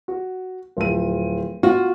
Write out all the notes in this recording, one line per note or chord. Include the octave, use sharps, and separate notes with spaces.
F#4
D1 F3 D#7
F4 F#4